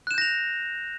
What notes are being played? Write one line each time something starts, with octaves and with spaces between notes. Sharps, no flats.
F#6 G6 A#6 E7 F7